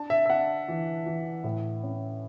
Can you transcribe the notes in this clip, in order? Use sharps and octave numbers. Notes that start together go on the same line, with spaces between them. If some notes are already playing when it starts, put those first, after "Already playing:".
Already playing: D4 A5
E5
E5
D4 F#5
E3
E3
A2
C#4